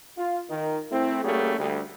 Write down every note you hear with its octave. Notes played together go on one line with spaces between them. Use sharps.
F4
D#3
A3 C4 E4
G3 A3 A#3 C#4 F#4 G#4
D2 G3